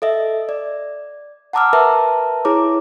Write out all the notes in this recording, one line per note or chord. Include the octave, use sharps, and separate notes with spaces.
A4 D#5 E5
D5
F#5 A5 A#5 D6 E6 F6
A#4 B4 E5 A5 A#5
E4 G#4 C#5 A#5 D6